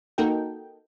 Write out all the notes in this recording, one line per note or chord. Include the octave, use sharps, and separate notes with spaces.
A#3 D#4 F#4 A4 A#4 G5